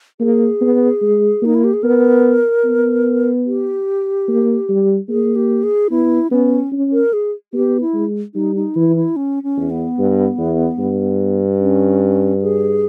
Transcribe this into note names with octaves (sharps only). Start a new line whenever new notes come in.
A#3 G#4
B3
G#3
A#3 D#4
E4
G4
G#4
B3 A#4
B3
G4
A#3
G3
A#3 G#4
G4
G#4
B3 E4
B3 C#4
C#4
A#4
G#4
B3 G4
E4
G#3
G3 D#4
D#4
E3 E4
E4
C#4
C#4
E2
B3
G2
E2
G2
C#4
G#4